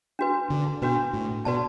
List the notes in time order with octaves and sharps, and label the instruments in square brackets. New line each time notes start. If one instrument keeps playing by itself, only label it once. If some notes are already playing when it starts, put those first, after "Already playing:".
[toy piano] D4 F#4 B4
[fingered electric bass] D3
[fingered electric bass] B2 [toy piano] D4 F#4 B4
[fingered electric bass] A2
[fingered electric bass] B2 [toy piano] F#4 B4 D5 A5